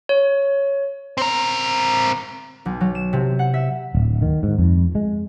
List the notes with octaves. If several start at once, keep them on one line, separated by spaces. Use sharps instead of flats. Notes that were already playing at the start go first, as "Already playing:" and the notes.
C#5
C4 A#4
B1
F#3
E7
C3
F#5
E5
D1
D#3
G#2
F2
G#3